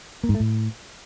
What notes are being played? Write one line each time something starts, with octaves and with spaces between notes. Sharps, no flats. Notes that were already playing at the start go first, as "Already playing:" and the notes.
A#3
G#2
A3
A2